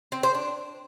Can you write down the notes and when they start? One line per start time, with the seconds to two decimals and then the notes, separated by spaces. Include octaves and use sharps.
0.12 C4
0.23 C5
0.35 D4